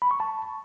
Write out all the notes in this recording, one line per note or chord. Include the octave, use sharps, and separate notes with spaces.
B5
C#6
A5